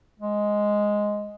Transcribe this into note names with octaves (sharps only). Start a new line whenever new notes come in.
G#3